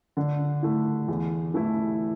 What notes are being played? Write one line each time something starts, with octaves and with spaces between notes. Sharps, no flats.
D3
A3 E4
E2
E3 A3 E4